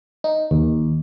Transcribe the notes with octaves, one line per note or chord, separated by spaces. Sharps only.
D#4
D#2